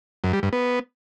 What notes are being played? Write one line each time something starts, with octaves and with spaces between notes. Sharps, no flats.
F#2
G3
G2
B3